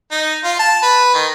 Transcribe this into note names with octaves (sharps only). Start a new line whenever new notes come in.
D#4
F4
A5
B4
D#3